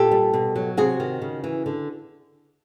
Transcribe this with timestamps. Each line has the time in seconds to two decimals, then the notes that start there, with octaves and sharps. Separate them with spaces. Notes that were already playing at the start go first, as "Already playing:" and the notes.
Already playing: A#2 G4 A4
0.11 G3
0.33 B2
0.56 F#3
0.77 C3 F#4 G#4
1.00 D#3
1.22 C#3
1.44 E3
1.66 D3